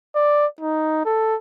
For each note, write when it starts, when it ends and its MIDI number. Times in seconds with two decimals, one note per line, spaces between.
0.15 0.46 74
0.61 1.01 63
1.05 1.36 69